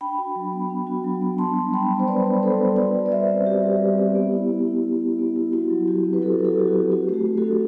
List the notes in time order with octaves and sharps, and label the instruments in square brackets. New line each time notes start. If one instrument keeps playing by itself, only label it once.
[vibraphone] D4 G5 B5
F#4
F#3
B3
D4
F#4
F#3
B3
D4 A5 C6
G3
G3 G5 B5
B3
C5
D4 B4 D5
G3
G3 A4 C5
B3
F#4 B4 D5
G3
D5
G3 C5 E5
C4
F#4 G4
G3
G3
C4
B3
E4
B3
E4
B3
E4
B3
E4
E4 F#4
F#3
F#3 G4
C4
B4
E4 F#4 A4
F#3
F#4 A4
F#3 G4
F#4
C4
F#4
A3 F#4
G4
A3
F#4 A4
D4